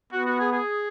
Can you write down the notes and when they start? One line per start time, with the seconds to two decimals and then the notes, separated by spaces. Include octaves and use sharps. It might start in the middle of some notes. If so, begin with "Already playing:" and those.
0.12 B3 F#4
0.26 F#4
0.39 G#4
0.52 G#4